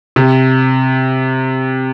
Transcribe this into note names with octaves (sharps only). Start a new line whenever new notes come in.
C3